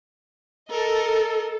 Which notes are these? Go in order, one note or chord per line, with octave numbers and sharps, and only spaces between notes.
A4 A#4 D#5